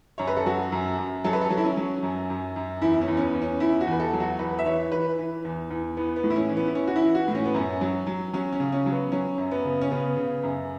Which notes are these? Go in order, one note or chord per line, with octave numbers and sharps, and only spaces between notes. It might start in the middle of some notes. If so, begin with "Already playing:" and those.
F#2 C#5
B4
A4
F#3 F#4
F#2
F#2
F#3 A4
B4
A4
F#3
E4
C#4
F#3
F#2
F#2
F#2
E2 E4
C#4
E2
C#4
B3
E2
C#4
E2 E4
F#4
E2 B4
A4
F#3
F#4
E2 B4
E5
E3 C#5
E3 B4
E3
E2
E2
E3 B3
B3
A2
E4
C#4
E3
B3
E4
E3 C#4
F#4
E4
E3
F#4
A2
C#4
B3
F#2 C#4
F#3
F#3
F#3 C#4
C#4
C#3
C#4
F#3
B3
F#3 C#4
F#2
B3
C#3
C#4
C#3 B3
C#3
F#2